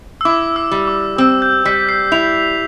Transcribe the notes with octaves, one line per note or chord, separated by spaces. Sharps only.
E6
E4 D6
E6
G3
D6
C4 E6
G6
G3 B6
C7
E4 F7